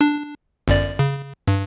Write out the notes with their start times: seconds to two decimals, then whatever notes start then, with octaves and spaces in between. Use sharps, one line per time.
0.01 D4
0.68 G1 F#2 D5
0.99 C#3
1.48 G2